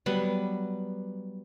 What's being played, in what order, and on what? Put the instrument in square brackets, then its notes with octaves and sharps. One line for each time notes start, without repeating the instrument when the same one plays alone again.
[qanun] F#3 G3 B3